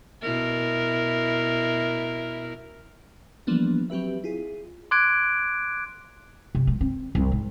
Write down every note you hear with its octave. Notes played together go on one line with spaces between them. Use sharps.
B2 E4 A#4
E3 F3 G3 A#3 B3 D4
F#3 C4 G4 B4 E5
E4 F4 G#4
C6 D6 F#6 G#6 D7
C3
G#3
C4
C2
G#2